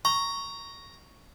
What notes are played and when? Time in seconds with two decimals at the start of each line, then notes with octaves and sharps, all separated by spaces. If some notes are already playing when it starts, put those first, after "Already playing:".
0.05 A#5 C#6